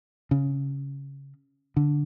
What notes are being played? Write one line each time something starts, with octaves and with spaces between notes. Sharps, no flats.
C#3
D3